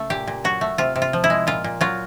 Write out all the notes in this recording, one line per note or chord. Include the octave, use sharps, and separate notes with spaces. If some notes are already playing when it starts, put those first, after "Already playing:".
Already playing: C#3 A3
A#2 G4
A#2
F#3 F#4
A3
C3 F4
C3
F4
F3
E4
G#3
A#2 F4
A#2
F#3 F4